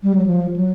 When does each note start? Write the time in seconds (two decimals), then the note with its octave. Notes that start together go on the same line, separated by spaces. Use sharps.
0.03 G3
0.15 F#3
0.26 F3
0.56 F#3